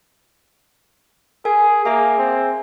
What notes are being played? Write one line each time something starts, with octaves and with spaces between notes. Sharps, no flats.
G#4 A#4 G#5
A#3 G#4 E5 G#5
C4